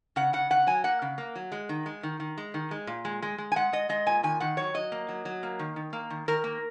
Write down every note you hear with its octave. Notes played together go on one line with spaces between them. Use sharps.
C#3 F#5
C#3 F#5
C#3 F#5
F#3 G#5
A#3 F#5
C#3
A#3
F#3
G#3
D#3
G#3
D#3
D#3
G#3
D#3
G#3
A#2
G#3
G#3
G#3
G#5
G#3 F#5
G#3 D#5
G#3 D#5
A#2 G#5
D#3 G#5
D#3 F#5
F#3 C#5
F#3 D#5
A#3
F#3
F#3
A#3
D#3
D#3
A#3
D#3
D#3 A#4
A#3